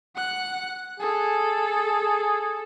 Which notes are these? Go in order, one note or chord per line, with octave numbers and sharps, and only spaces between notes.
F#5 F#6
G#4 A4